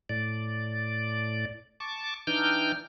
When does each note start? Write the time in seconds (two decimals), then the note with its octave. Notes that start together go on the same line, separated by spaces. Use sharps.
0.09 A2 D5
1.80 A5 C#6 D6
2.27 E3 D4 D#4 G5 F6 G6